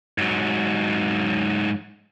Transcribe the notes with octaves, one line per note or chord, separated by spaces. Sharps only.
G#2 F#3